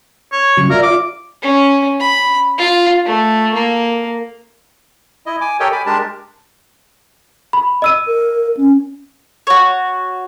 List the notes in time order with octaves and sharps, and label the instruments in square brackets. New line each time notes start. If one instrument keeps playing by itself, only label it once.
[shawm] C#5
[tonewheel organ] C#3 F#3
[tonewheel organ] F4 D5 E5 [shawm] A#4
[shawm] D6
[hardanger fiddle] C#4
B5
F4
A3
A#3
[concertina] E4 D#5
G#5 D6
G4 A4 A#4 C#5 D#5 G5
G#5 B5 D6
G#3 D4 G4 A#4 A5
[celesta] B5
D#5 E6 D#7
[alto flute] A#4
C#4
[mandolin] F#4 C#5